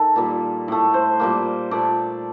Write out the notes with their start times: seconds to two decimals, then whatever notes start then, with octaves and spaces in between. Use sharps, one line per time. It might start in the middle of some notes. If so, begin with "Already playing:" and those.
Already playing: D#3 A4
0.16 A#2 G3 A#3
0.68 A2 A3
0.94 C5
1.20 A#2 G3 A#3
1.71 A#2 A3 D5